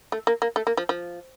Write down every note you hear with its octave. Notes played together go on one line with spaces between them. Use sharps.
A3
A#3
A#3
A3
A#3
F3
F3